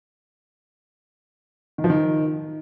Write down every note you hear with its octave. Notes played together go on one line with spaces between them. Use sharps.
D#3
F3
D#3